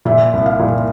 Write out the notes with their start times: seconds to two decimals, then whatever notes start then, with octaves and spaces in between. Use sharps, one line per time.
0.05 A#2 E5
0.33 C2
0.46 F5
0.59 A#2